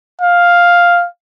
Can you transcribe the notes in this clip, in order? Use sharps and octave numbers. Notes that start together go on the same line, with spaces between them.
F5